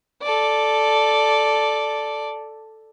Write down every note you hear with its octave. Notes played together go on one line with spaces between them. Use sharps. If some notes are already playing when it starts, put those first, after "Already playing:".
A4 D5